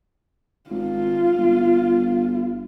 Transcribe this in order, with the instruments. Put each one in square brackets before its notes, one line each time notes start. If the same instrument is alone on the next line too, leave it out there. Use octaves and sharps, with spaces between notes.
[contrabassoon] G#1 [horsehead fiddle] F4
[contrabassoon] G1